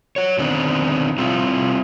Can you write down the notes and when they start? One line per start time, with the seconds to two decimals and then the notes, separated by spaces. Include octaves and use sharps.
0.16 F#4 C#5
0.39 D3 D#3 B3 C4 D4
1.18 G3 C4 E4 F4